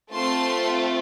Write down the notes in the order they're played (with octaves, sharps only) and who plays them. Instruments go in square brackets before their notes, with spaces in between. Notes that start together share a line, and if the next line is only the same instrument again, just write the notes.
[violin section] A3 C4 F4 A4 A5 C6